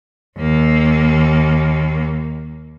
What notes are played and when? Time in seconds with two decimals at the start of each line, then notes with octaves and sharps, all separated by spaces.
0.39 D#2 A#3